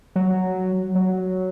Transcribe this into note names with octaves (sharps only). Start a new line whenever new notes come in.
F#3
F#3